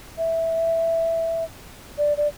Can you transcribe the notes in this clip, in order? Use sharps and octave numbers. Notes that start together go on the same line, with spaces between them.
E5
D5
D5